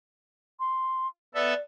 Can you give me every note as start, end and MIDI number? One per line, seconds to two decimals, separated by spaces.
0.60 1.07 84
1.35 1.54 59
1.35 1.54 69
1.35 1.60 74
1.35 1.54 76